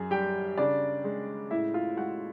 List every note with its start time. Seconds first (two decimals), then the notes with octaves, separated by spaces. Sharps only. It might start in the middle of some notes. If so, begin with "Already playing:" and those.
Already playing: F#2 G#4
0.11 G3 G4 G5
0.58 C#3 D4 D5
1.04 G#3
1.51 A2 E4 E5
1.74 F4 F5
1.97 G#3 F#4 F#5